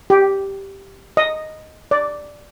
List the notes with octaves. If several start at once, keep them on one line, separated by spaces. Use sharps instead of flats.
G4
D#5
D5